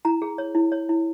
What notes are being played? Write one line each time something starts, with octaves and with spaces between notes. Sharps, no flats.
E4 A#5
G#4
C#5
E4
C#5
E4